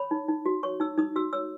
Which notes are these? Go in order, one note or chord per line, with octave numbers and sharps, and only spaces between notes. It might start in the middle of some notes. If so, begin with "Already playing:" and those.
Already playing: C#5 B5
D#4
D#4
F#4
C#5 C#6
D#4 E6
D#4 D#6
F#4 E6
C#5 E6